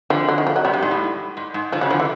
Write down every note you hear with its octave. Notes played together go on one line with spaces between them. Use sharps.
D3 F3
F#3
D#3
F3
F#3
C3 G3
G2
G#2
A2
G#2
G#2
D3 F3
C#3 F#3
D3 F3
E3